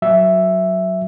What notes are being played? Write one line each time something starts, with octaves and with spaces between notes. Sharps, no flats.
F#3 E5